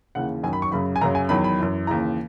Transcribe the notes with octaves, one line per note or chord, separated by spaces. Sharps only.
D#2 C#3 E3 F#5
F#2 D#3 F#3 G#5
B5
C#6
F#2 C#3 F#3 B5
G#5
F#2 C#3 F#3 A#5
G#5
E2 D#3 F#3 B5
B5
F#2 E3
D#2 C#3 E3 A#5